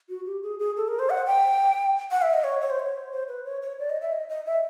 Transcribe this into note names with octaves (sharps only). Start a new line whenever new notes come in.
F#4
G4
G#4
G#4
A4
A#4
C5
F#5
G5
F#5
E5
D#5
C#5
C#5
C5
C#5
C5
B4
C#5
C#5
D5
D#5
E5
D#5
D#5
E5